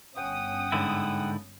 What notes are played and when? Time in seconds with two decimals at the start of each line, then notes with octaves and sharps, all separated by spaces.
0.17 G1 C#4 F#5 G5 D#6
0.72 G#2 D3 E4